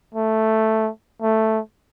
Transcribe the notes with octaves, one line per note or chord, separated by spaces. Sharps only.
A3
A3